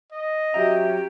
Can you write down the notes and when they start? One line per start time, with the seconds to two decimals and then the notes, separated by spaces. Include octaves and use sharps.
0.12 D#5
0.54 F#3 C#4 G4 E5 G5 A#5